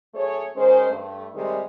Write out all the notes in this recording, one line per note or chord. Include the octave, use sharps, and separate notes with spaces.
F#2 A3 G#4 C#5
D#3 G#3 C#4 C5
G2 A3
C3 D#3 G3 G#3